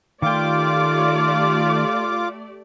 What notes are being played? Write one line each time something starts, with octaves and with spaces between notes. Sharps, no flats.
D#3 A3 F4 G4 D5 G5 D6